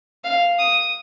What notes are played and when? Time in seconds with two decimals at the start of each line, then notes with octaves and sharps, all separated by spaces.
0.24 F5
0.59 D#6